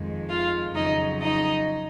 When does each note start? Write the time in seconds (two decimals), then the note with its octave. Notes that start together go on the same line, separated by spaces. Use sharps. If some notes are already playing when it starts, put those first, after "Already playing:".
Already playing: F2 D#3 G#3
0.29 F4 F5
0.75 F2 C#3 F#3 D#4 D#5
1.21 D#4 D#5